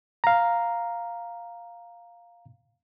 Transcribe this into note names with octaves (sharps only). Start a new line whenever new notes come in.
F5 A#5